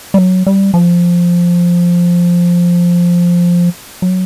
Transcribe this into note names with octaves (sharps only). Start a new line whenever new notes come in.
G3
F#3
G3
F3
F#3